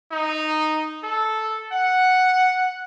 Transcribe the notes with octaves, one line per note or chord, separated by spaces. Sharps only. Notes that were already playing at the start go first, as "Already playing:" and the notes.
D#4
A4
F#5